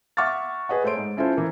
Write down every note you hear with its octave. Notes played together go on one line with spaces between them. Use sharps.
E5 F#5 C#6 D6 F6 A6
G#4 B4 D#5 F#5
A3 C5 C#5 C6 D7
G#2
C#4 E4 F4 A4 C5
E3 A#3